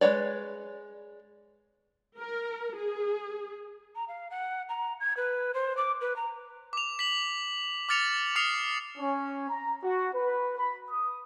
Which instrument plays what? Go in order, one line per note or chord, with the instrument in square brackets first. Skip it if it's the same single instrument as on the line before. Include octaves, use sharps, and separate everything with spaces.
[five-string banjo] G#3 B4 C#5 D5
[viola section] A#4
G#4
[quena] A#5
F5
F#5
A#5
G#6
B4
C5
D6
B4
A#5
[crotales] D6 F7
B6 F#7
D6 F6 A6 C#7 F7
D6 D#6 F6 C7 C#7 F7
[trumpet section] C#4
A#5
F#4
B4
B5
D#6